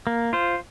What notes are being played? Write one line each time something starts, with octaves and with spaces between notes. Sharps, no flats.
A#3
F4 C5